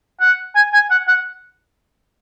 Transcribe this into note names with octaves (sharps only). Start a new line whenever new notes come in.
F#5
G#5
G#5
F#5
F#5